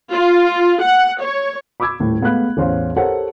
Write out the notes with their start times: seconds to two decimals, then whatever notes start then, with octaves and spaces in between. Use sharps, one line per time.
0.12 F4
0.82 F#5
1.21 C#5
1.80 B5 C#6 D6 E6 G#6
2.00 D#1 A2
2.21 G#3 A3 B3 F5 B5 F#6
2.57 A1 E2 C#4 C5 F5 C6
2.96 G4 A4 A#4 C5 C#5 F#5